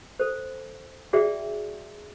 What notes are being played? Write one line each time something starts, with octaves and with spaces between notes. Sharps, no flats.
A4 C5
F#4 G#4 D5 E5 G5